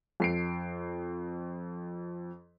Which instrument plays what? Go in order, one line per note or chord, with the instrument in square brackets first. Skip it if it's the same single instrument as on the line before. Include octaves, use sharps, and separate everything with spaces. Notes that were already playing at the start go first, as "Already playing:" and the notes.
[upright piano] F2 C7 D7